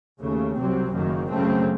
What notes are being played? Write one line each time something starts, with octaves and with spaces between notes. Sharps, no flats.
D#2 C#3 A3
C2 C3 F#3 C4
F#1 F#2 D#3 A#3
F#2 C#3 A3 C4